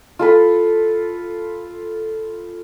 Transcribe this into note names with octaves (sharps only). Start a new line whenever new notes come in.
F4 A4 B4